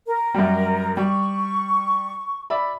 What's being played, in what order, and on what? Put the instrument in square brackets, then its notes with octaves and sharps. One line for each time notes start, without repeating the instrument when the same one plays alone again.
[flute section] A#4
[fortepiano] F#2 G3
[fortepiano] G3 [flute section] C#6
[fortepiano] D5 E5 B5